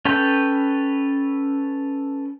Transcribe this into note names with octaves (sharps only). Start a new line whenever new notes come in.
C#4 A4 B4 G5